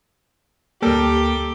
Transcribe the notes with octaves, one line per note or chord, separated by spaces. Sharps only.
D2 G3 A#3 G4 A4 A#4